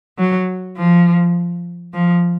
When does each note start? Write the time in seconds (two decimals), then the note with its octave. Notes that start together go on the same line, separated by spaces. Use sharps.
0.18 F#3
0.77 F3
1.93 F3